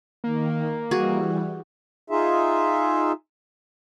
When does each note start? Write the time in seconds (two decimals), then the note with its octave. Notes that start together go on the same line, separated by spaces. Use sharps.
0.24 D#3 A#3
0.91 E3 G3 F#4 G#4
2.10 D#4 F4 G#4 E5